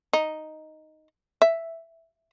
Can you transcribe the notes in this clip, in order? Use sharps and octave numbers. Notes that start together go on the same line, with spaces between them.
D#4
E5